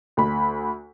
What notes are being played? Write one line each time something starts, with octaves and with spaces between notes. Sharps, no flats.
D2 B5